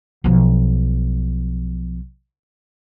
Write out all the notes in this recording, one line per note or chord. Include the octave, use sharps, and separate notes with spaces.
B1 F3